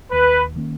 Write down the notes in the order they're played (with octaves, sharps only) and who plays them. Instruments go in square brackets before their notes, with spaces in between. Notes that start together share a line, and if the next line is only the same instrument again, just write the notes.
[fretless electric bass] D#2 [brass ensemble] B4
[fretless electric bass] D#3 A#3 C#4